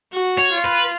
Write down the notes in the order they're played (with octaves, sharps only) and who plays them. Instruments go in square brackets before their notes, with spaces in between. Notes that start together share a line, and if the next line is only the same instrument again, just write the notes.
[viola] F#4
[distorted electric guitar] C#5
[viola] F4
[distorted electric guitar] B4